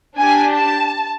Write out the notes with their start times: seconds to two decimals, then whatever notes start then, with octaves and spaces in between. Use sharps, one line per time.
0.18 D4 G4 G#5
0.54 A5